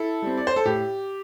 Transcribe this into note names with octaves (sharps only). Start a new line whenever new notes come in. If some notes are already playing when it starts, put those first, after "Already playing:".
Already playing: E4 A4
G3 C4
D5
C5
A4
A2 G4